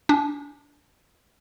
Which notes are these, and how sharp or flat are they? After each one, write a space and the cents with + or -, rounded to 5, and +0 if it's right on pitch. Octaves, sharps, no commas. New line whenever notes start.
D4 -25 G#5 +0